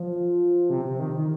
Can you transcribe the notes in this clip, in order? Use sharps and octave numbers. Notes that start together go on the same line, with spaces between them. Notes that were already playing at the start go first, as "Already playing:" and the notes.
Already playing: F3
C3
C3
D#3
D#3